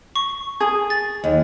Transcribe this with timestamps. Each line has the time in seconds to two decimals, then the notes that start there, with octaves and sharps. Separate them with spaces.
0.16 C#6
0.60 G#4
0.90 A6
1.24 D#2